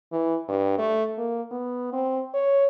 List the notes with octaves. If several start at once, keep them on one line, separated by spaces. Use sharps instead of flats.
E3
G2
A3
A#3
B3
C4
C#5